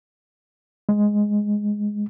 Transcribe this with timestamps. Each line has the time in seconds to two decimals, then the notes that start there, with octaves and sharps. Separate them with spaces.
0.89 G#3